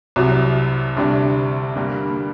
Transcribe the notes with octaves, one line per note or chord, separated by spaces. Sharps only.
C2 C3 F#3
D2 C3 G3 D4
G2 D3 G3 A#3